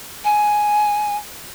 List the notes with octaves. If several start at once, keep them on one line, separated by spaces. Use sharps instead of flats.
G#5